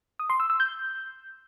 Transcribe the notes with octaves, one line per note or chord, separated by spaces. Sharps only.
D#6
C6
E6
E6
G6